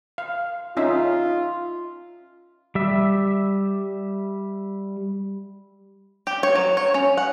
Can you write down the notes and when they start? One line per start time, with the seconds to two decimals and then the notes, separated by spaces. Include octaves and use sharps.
0.18 F5
0.77 C#4 D#4 F4 E5
2.75 G3 E5
6.27 G4
6.43 C#5
6.55 F#3
6.77 C#5
6.94 C#4
7.17 F#5